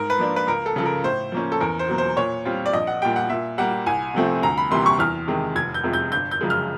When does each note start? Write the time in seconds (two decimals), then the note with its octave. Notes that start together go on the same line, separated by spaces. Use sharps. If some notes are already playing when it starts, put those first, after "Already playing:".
Already playing: G#2 A#4
0.10 B4
0.19 F3 A#3 D4 F4
0.36 B4
0.47 C#2 A#4
0.66 A4
0.76 C#3 F3 A4
0.86 A#4
1.04 A2 C5
1.32 F3 A#3 C#4
1.52 A4
1.61 E2 A#4
1.79 C5
1.88 B2 F#3 A#3
1.98 C5
2.16 A#2 C#5
2.45 G3 C4 F4
2.66 D5
2.73 A#1 D#5
2.87 F#5
3.02 A#2 G3 G5
3.16 F#5
3.30 A#2 E5
3.58 G3 A#3 F#5
3.86 C2 G#5
4.14 C3 F3 A3 C4
4.43 D2 A#5
4.58 B5
4.71 C3 E3 G3 A#3 C6
4.86 C#6
4.99 E2 F6
5.28 C3 D#3 G#3
5.55 F1 G#6
5.74 G6
5.84 F2 C3 F3 G#3
5.93 G6
6.12 G1 G6
6.31 G6
6.41 F#2 C#3 F3 G#3
6.50 F6